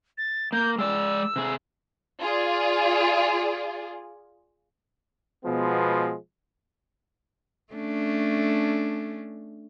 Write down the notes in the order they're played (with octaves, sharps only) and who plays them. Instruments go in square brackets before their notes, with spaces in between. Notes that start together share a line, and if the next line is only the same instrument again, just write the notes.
[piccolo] A6
[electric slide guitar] A#3 [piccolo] G6
[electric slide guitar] G#3 D5 [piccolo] E6
[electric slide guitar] C3 G#4
[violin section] F4 G#4 D5
[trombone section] B2 F3 G#3 B3
[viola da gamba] A3 C#4 D4